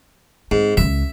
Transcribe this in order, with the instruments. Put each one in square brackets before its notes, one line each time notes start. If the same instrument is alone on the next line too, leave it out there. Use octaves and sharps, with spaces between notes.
[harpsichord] G#2 [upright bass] C4
[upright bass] D#1 C#2 [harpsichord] E5